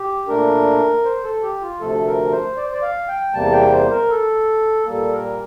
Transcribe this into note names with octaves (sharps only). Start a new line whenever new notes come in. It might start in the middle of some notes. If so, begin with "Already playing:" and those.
Already playing: G4
A#2 A3 D4 A#4
C5
A4
G4
F4
D2 C3 F3 A3 A4
A#4
C5
D5
C5
D5
F5
G5
E2 C3 G3 A#3 A5
G5
C5
A#4
A4
A#2 G3 A#3 A4
A#4